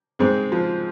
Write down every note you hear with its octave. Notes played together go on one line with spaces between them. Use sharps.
G#2 G#3 C4
F3